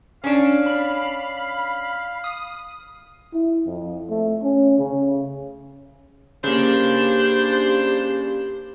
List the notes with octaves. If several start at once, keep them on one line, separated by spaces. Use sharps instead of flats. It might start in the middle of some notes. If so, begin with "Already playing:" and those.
C#4 D4 F5
B5
D#6
E4
F2
A3
C#4
C#3
C#3 A#3 D4 G4 C5